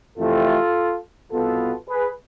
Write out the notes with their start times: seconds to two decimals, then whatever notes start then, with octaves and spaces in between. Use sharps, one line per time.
0.18 F2 C3 E3 A3 F4 A4
1.32 C2 B2 B3 F4 A4
1.89 G#4 B4